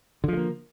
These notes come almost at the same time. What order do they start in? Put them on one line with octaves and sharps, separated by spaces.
D3 F3 G#3 A#3